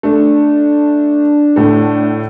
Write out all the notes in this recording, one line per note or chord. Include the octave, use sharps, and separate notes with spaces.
A3 D4
A2 D3 A3